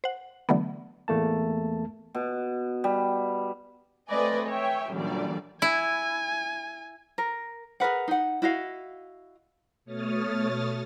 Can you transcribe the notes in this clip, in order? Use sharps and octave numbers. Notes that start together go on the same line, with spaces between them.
C5 F#5
D3 E3 F#3 A3 B3
A1 E2 A3 A#3 A5
B2
G3
A3 C4 B4 D5 D#5 G#5
C#5 E5 G5 G#5
F#2 A#2 D3 E3 G3 D5
E4 G#5
A#4
G#4 A#4 B4 F#5
D#4 F#5
E4 F#4 D#5 F5
B2 A3 C#5 D#6 F6 A6